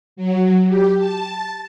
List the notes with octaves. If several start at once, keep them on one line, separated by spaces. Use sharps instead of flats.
F#3
G4
A5